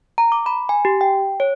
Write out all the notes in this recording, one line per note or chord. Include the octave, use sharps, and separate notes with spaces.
A#5
D6
B5
G#5
G4
G5
C#5